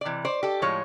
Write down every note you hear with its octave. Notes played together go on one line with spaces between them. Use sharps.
D5
C3 E3
C5 D5
G4 A4
A2 F3 G#3 C#5